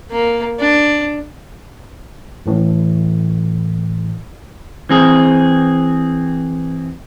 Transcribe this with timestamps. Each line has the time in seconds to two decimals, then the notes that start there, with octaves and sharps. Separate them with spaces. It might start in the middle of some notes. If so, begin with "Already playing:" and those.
0.11 A#3
0.59 D4
2.46 A1 A2 E3
4.90 E3 C4 G#4